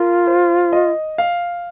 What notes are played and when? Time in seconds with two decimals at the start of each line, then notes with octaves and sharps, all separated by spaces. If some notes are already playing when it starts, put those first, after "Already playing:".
Already playing: F4 A#4
0.27 C5
0.73 D#5
1.18 F5